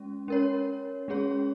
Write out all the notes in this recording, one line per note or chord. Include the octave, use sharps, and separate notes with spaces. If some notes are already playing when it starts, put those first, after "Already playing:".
Already playing: G#3 C#4
C#4 A#4 C#5
G#3 C#4 G#4 C#5